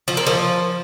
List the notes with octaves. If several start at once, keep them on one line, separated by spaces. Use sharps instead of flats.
F3
A#3
F3